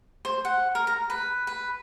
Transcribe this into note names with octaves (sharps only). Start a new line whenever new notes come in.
C5
F#5
A#4
A#5
B4
B4